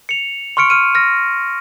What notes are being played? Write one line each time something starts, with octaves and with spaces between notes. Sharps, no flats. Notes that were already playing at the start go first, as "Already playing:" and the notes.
C#7 F7
C6 C#6 F6 C#7 D7
F6 D#7
F6 A#6